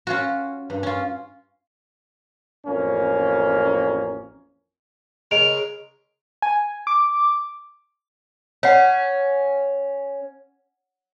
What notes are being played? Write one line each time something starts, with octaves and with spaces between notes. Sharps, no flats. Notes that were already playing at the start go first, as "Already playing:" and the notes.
C#4 F4 F#4
G2
C#4 F4
A1 F2 A#3 C#4
C#3 G#3 A#4 D#5 D7 F7
G#5
D6
C#4 C#5 F#5